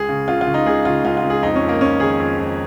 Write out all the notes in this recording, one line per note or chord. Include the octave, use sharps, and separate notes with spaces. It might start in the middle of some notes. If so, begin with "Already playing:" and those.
Already playing: C#2 G#4
C#3
C#2 F4
F4
C#3
D#4
C#2 G#4
C#3 F4
C#2 F4
F4
C#2
G#4
F2 D#4
C#4
F2
A#3
F2 C#4
D#3 G#4
F2
F2